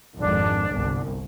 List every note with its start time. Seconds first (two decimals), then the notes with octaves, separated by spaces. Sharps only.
0.18 G#1 F2 G#2 D4
0.72 G1 C2